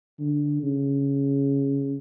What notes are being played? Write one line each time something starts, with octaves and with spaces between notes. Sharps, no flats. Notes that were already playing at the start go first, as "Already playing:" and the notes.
D3
C#3